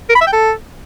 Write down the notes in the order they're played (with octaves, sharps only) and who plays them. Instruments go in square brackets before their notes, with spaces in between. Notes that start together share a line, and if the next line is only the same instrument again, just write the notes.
[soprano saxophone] A#4
B5
E5
G5
A4